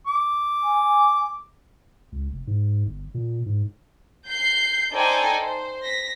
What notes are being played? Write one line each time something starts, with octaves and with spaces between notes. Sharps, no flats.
D6
G#5
C#2
F1
G#2
G1
A#2
G#2
G6 C7
D#4 A4 C5 D5 G5 G#5
C5
A#6 B6